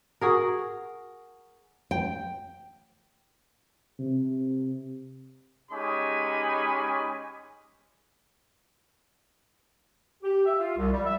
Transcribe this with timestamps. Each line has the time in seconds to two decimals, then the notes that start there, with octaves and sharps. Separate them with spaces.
0.21 F#4 G#4 A#4
1.91 G5
3.99 C3
5.71 G#3 C#4 D#4 G4 G#5 B5
10.24 G4
10.46 E5
10.59 F4
10.78 C2
10.92 G3
11.05 E5